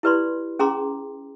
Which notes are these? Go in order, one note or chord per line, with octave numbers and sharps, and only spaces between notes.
E4 G4 B4 D5 B5 C6
C#4 G#4 G5 A#5 C6 D6